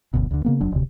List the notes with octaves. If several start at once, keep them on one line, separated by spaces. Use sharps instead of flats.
F#1 D2 B2
D2 D3
C#3 A#3 B3
F1 F#3 D4
E1 D2 C3